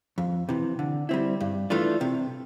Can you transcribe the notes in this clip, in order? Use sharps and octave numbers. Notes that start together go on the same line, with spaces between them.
F2
C3 E3
D3
G3 C4 E4
G2
E3 A3 D4 F4
C3